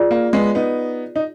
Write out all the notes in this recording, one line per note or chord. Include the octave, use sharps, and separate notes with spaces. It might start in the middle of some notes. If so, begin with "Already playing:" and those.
Already playing: F4 G#4 D5
A#3
G#3 B3
B3 D#4
D#4